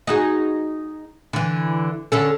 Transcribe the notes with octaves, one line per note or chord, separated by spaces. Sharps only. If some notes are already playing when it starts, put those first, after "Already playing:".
D#4 F#4 G#4
D3 E3
D3 C#4 A4